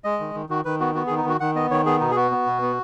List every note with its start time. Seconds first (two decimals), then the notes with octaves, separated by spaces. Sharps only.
0.04 G#3 D#5
0.20 D#3
0.34 D#3
0.49 D#3 F#4
0.65 D#3 B4
0.80 B3 F#4
0.95 B3 F#4
1.07 G#4
1.10 D#3
1.17 D#4
1.25 D#3 F#4
1.40 D#3 F#5
1.55 B3 D#5
1.70 D#3 C#5
1.86 B3 G#4
2.00 B2 D#4
2.11 G#4
2.16 B3 F#4
2.31 B3
2.46 B2
2.62 B3